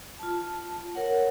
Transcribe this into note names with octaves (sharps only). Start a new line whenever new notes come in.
F4 A5
A#4 C#5 F#5